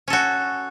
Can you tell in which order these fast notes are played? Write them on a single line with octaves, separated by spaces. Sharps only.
C#4 A4 F#4